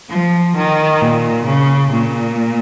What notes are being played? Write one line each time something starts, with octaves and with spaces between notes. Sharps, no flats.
F3
D#3
A#2
C#3
A#2